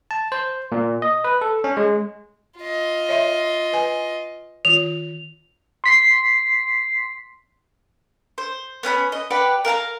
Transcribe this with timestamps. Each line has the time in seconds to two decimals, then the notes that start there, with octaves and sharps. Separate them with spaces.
0.11 A5
0.32 C5
0.72 A#2
1.02 D#5
1.24 B4
1.41 A4
1.64 C#4
1.77 G#3
2.59 F4 D#5
3.09 C#5 E5 C6
3.73 B4 G#5
4.65 D#3 F4 F7
5.84 C6 B6 C7
8.38 C5
8.83 B3 C#4 G5 B5
9.12 D#5
9.31 G4 B4 D5 F#5
9.65 A#4 F5 A5 A#5